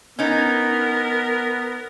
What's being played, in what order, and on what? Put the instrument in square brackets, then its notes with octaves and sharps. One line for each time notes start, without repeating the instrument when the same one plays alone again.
[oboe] B3 [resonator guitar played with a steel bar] C#4 D#4 [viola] A#4